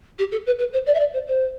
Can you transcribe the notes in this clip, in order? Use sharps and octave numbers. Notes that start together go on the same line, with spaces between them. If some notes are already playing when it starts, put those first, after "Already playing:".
G4
A4
B4
B4
C5
D5
E5
D5
C5
C5